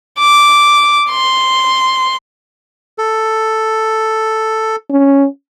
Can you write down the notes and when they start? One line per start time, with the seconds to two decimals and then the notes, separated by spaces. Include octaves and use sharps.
0.19 D6
1.10 C6
2.98 A4
4.90 C#4